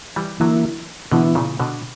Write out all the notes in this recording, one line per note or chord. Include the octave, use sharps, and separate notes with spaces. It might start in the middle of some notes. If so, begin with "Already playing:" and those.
E3 G3
D3 E3 F#3 A#3 E4
B2 D3 E3 B3 E4
A#2 C#3
B2 D3